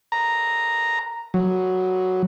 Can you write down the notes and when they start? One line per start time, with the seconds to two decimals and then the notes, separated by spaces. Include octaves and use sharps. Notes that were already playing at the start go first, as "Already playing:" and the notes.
0.12 A#5
1.34 F#3